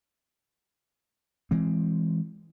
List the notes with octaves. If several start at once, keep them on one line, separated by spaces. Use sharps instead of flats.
E3 G#3 C4